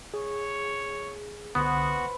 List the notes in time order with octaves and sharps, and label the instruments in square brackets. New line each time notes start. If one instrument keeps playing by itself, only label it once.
[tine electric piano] G#4 [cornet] C#5
[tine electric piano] C2 D3 D#6 [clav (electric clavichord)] B3 [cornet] F#4 [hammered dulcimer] B4 C5